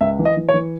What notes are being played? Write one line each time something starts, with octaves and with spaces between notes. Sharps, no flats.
C#2 E5
E3
D#5
E3
C#5
E3